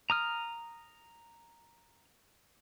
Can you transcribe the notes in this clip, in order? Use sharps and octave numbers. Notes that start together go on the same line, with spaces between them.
A#5 D#6 F6